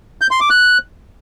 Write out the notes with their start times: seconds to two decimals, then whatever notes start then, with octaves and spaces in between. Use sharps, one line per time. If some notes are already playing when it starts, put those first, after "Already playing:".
0.21 G6
0.31 C6
0.40 D6
0.50 F#6